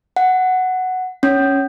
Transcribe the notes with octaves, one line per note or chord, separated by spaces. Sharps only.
F#5
C#4